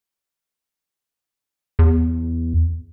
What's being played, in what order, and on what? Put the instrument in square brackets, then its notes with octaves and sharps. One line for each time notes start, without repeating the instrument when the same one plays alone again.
[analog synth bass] E2